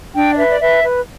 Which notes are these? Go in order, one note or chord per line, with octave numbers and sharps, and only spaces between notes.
D4 G5
D5
B4 E5
D5
B4 E5
B4